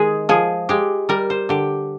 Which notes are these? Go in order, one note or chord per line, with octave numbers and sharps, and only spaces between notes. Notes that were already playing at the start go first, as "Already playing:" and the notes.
Already playing: D#3 G#3 G#4
F3 G#4
G#3 G4
G3 A#4
C5
D3 G4